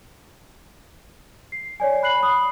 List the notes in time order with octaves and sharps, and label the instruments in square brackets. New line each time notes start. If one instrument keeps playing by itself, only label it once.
[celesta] C7
C#5 D5 G#5
B5 F#6 C7 F#7
B5 D#6